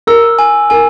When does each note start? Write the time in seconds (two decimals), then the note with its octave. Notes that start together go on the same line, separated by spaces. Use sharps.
0.07 A#4 E6
0.39 G#5
0.70 A#4 G#5